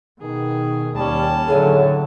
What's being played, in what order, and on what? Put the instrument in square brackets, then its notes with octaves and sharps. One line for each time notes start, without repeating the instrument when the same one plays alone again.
[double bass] B2 [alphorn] D#3 [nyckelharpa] G#4
[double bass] D#2 [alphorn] G3 [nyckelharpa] C#4 A5
[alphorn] A2 [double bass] D3 F#3 [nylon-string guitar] G#4 C#5 G#5